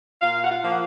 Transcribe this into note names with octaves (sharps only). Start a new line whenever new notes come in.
A#2 F4 F5
F#5
F4 F5
F3 A#3
F#5